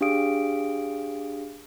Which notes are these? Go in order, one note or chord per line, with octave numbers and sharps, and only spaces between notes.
D4 G4 G#4 F5 D#6 D7